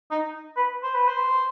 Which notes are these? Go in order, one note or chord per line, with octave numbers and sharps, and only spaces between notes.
D#4
B4
C5
B4
C5